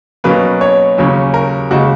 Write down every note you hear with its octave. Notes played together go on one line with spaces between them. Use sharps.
B2 F#3 A#3 C#4 B4
C#5
D#2 C#3 F#3 C#4
A#4
D#2 C#3 G#3 F#4